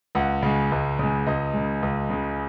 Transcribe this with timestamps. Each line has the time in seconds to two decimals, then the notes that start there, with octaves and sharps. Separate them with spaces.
0.15 C#2 F#5
0.43 C#3 G#3
0.72 C#2
0.99 C#3 G#3
1.27 C#2 D#5
1.54 C#3 G#3
1.82 C#2
2.10 C#3 G#3